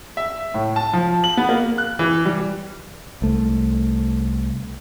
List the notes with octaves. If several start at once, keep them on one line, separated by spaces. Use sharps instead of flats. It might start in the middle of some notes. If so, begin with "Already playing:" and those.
E5
A2
A5
F3
F#7
B3
A#3
F#6
E3
G3
C2 A3